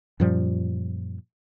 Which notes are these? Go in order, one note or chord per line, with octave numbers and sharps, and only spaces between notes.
F#2 A#2 F3 G3